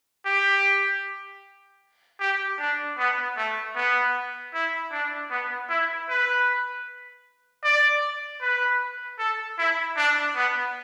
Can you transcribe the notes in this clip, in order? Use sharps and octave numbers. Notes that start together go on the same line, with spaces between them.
G4
G4
D4
B3
A3
B3
E4
D4
B3
E4
B4
D5
B4
A4
E4
D4
B3